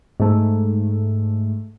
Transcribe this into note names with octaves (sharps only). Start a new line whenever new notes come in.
G#2 A3